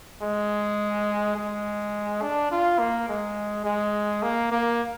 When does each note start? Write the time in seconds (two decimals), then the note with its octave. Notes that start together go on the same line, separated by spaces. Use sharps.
0.22 G#3
1.37 G#3
2.22 D4
2.51 F4
2.79 A#3
3.09 G#3
3.65 G#3
4.23 A#3
4.52 A#3